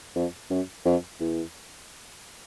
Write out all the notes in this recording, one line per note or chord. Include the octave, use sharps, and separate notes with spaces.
F2
F#2
F2
E2